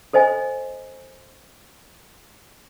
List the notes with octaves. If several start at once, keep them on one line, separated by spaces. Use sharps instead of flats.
A4 C5 D#5 G#5